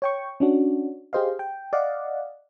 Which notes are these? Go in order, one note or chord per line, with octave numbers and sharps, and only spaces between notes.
C#5 G5 C#6
C#4 D4 F#4
G4 G#4 C5 D#5 F5
G5
D5 D#5 F5 F#5